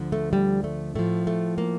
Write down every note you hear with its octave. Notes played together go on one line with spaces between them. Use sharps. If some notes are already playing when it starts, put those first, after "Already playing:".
Already playing: D2 D3 F3
A3
G3
A3
A2 F3 A3
A3
A#3